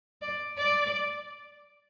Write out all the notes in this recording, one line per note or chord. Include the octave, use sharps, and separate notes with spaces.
D5
D5